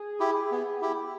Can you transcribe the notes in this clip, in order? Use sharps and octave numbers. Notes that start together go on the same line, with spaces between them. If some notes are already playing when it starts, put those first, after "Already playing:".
Already playing: G#4
E4 G4
B3
E4 G4